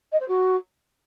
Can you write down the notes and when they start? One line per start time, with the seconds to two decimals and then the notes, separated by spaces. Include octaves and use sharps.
0.12 D#5
0.20 C5
0.28 F#4